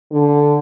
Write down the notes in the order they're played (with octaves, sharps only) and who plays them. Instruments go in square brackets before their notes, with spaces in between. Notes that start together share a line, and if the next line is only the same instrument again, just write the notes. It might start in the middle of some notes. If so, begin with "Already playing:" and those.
[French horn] D3